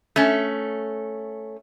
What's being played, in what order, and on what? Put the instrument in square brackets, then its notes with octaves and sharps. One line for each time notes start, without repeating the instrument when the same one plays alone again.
[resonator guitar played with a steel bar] A3 C#4